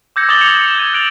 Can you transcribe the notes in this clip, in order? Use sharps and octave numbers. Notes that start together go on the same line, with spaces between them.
D6 E6 G6 G#6 A#6 C#7
D6 D#6 G6 A6 F#7 G7
G#6 A#6 C#7 E7 F7
D#6 C#7 E7
G6 G#6 D#7
F#6 A6 D7 F7 F#7